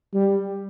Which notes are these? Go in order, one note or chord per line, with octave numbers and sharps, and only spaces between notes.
G3